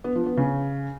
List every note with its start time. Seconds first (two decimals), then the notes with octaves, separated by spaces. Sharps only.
0.04 B3
0.15 F3
0.26 B3
0.37 C#3